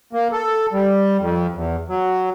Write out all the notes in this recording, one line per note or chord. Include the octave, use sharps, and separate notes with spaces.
A#3
A4
G3
F2
E2
F#3